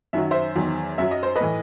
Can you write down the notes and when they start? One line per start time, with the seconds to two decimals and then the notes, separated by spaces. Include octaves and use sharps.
0.13 F#2 D#3 F#3 E5
0.31 C5 E5
0.55 E2 D#3 F#3
0.98 F#2 F#3 E5
1.11 D#5
1.23 C5
1.36 B4 D#5
1.41 A2 E3